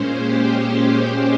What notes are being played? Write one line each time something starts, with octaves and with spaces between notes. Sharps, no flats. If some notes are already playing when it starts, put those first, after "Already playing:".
Already playing: A#2 G#3 C#4 C5
G4
G4